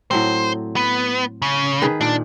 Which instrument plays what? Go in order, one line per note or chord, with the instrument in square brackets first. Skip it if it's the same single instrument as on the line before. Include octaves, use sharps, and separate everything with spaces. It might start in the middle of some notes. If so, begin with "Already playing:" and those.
[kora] A2 F#3 C4 [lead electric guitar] C5
[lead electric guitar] B3
C#3
[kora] D#3 G#4 B4
[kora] A#2 [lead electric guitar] D4